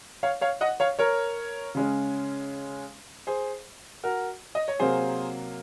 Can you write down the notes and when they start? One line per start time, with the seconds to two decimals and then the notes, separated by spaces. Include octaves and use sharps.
0.23 C#5 F5
0.41 C#5 F5
0.61 D#5 F#5
0.80 C#5 F5
0.99 A#4 C#5
1.75 C#3 G#3 C#4
3.27 G#4 C5
4.03 F#4 A#4
4.55 D#5
4.68 C#5
4.79 C3 F#3 A#3 G#4 C5